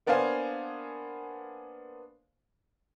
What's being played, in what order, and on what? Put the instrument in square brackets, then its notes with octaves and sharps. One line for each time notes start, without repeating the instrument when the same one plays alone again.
[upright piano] A#3 B3 D4 C5 F5 G#5